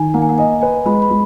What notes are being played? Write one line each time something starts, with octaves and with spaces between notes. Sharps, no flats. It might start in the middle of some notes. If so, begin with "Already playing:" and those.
Already playing: D#3 G#5
A#3 F#5
G#5
F#5
D#5 G#5
B4 G#5
G#3 B5
B5
G#3